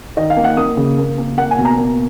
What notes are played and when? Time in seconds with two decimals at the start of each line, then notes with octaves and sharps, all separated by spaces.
0.17 D#3 D#5
0.30 F5
0.37 A#3
0.44 F#5
0.57 A#3 D#6
0.77 C#3
0.98 A#3
1.18 A#3
1.38 A#3 F#5
1.51 G#5
1.58 B2
1.65 A#5
1.78 A#3